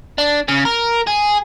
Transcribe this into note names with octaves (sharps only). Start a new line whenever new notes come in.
D4
C#3
A#4
G#4